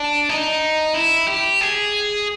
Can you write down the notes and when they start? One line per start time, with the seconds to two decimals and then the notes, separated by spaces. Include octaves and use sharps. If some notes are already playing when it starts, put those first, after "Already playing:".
Already playing: D4
0.29 D#4
0.94 E4
1.28 G4
1.61 G#4